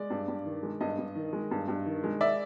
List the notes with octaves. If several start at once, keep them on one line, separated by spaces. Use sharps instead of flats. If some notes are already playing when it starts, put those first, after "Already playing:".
Already playing: G#3 D5
G2
G2
D#3
G#3
G2 D#5
G2
D#3
G#3
G2
G2
D#3
G#3
D5 E5